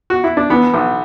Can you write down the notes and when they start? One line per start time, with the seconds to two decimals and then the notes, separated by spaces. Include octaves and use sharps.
0.10 F#4
0.24 E4
0.37 D4
0.50 E3 B3
0.74 B1